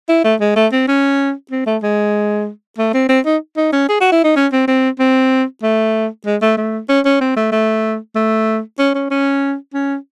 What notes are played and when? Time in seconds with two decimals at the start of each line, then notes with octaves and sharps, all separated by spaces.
0.09 E4
0.24 A3
0.40 G#3
0.56 A3
0.72 C4
0.88 C#4
1.51 C4
1.66 A3
1.83 G#3
2.78 A3
2.94 C4
3.09 C4
3.26 D#4
3.57 D#4
3.72 C#4
3.89 G#4
4.01 F#4
4.12 E4
4.24 D#4
4.36 C#4
4.52 C4
4.67 C4
4.99 C4
5.63 A3
6.26 G#3
6.42 A3
6.57 A3
6.89 C#4
7.05 C#4
7.21 C4
7.36 A3
7.52 A3
8.15 A3
8.79 C#4
8.95 C#4
9.10 C#4
9.74 C#4